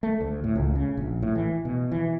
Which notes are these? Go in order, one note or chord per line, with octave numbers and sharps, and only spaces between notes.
A3
D2
A2
C#2
C#3
A#1
A2
E3
B2
E3